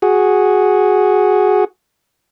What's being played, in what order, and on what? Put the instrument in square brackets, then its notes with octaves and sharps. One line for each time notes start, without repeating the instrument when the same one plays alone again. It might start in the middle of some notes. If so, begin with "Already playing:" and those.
[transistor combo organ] F#4 G#4